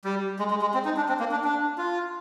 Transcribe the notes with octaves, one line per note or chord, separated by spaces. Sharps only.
G3
G#3
G#3
G#3
C4
D#4
D4
C4
A#3
D4
D4
F4